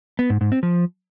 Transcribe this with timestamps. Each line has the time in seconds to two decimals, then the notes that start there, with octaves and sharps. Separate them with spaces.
0.19 B3
0.30 G#2
0.41 G#2
0.52 C4
0.63 F3